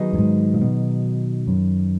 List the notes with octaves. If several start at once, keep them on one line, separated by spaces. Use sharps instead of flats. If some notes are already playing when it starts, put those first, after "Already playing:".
Already playing: D#3 F#3 B3 D#4 G#4
F#2
G#2
A#2
B2
F#2